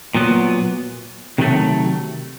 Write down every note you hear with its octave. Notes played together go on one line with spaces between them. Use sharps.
A#2 F#3 B3
C3 D#3 F#3 A3